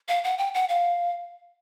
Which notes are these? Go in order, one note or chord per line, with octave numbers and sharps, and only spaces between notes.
F5
F#5
G5
F#5
F5